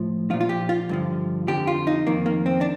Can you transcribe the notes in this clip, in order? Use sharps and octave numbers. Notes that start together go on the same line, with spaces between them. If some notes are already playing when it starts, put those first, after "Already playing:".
Already playing: A2 F3
A#2 F3 F4
F4
G4
F4
G2 D3 F3
F2 D3 F3 G4
F4
D#4
F2 D#3 A#3
A#3
C4
D4